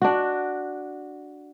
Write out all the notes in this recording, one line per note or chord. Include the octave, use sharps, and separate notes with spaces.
D4 F#4